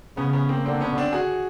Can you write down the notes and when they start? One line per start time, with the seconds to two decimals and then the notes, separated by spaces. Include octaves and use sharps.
0.17 C#3 B3 C#4
0.33 B3 C#4
0.49 A#3 C4
0.65 D3 A#3 C4
0.81 B3 C#4
0.97 C4 D4
1.13 F#4 G#4